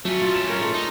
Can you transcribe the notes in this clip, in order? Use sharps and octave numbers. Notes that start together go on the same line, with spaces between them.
F#3 A3 C#4
F4
E7
F4 A#4 C#5
G#3 F4 A4
D#4